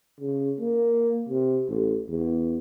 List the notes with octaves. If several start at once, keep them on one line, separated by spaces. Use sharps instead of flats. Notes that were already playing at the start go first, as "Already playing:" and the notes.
C#3
A#3
C3
A1
E2